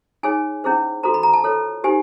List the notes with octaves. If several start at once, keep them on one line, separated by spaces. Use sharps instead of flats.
D#4 G#4 C#5 G#5
C#4 E4 G#4 C5
F#4 A4 C5 A#5
B5
A#5
A5
F4 A4 C#5
D#4 G4 C5 G#5